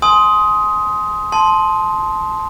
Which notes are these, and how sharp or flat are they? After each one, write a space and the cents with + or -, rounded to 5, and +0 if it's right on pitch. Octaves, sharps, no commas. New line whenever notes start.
G#5 +25 C6 +0 D#6 +15
A5 -15 C6 +0